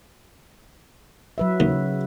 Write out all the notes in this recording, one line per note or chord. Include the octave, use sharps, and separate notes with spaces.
F#3 B4 E5
D#2 C#3